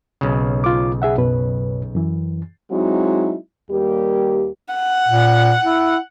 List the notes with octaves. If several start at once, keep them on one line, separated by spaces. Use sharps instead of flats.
B1 C#3
F4 D6
G#4 E5 F#5
F#2 B2 B4
F#2 E3
F#3 G#3 C4 D#4 E4 F#4
D#2 G3 A#3 G4
F#5
A#2
E4